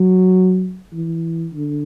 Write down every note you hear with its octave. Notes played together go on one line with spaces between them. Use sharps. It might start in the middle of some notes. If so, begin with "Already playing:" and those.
Already playing: F#3
E3
D3